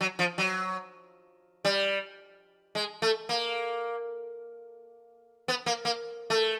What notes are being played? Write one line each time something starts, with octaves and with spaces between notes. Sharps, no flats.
F#3
F3
F#3
G3
G#3
A3
A#3
B3
A#3
A#3
A3